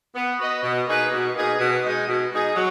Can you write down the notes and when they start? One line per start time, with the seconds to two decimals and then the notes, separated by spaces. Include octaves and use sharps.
0.15 B3
0.39 F#4 B4 D#5
0.63 B2
0.87 A#3 D#4 G#4 B4
1.11 B2
1.34 A#3 D#4 G#4 B4
1.59 B2
1.84 G#3 D#4 G#4
2.07 B2
2.31 G#3 D#4 G#4
2.55 F#3